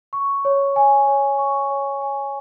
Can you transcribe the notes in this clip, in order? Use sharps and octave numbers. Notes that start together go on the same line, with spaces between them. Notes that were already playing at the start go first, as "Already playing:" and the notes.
C#6
C#5
G#5
C#5
C#6
C#5
G#5